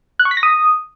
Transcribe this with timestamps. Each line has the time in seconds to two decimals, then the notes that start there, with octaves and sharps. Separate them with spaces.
0.19 F#6
0.25 C#6
0.31 B6
0.37 A#6
0.43 D#6